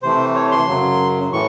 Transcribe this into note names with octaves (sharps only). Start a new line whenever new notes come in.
C3 E3 A3 C5
C#5
C6
F#2 C#3 F#3
A2 E3 C#6